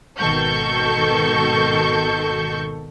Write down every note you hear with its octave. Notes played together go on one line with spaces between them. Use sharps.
G#1 B2 D#3 A4 C#6 G6